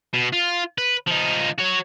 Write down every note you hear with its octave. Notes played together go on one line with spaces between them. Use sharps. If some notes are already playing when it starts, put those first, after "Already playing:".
B2
F4
B4
F3 D#4
F#4 C#5